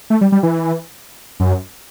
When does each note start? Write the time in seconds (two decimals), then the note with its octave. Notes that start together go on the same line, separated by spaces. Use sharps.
0.10 A3
0.21 G3
0.32 G3
0.43 E3
1.40 F#2